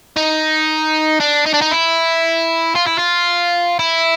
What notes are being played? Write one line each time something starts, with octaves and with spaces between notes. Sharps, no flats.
D#4
D4
D#4
D4
D#4
E4
F4
E4
F4
E4